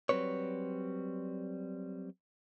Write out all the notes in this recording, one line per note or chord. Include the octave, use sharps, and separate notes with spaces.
F#3 G3 C4 B4 C#5